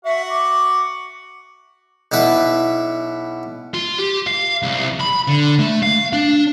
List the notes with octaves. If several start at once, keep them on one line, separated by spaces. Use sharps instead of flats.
F#4 E5 F#5
D6
B1 B2 E4 B4
F4
G4
F5
C2
B5
D3
A3
F5
D4